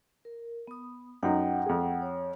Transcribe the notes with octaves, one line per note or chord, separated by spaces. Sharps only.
A#4
B3 D#6
F#2 D#4 F#5 G5
F2 G#4
C#5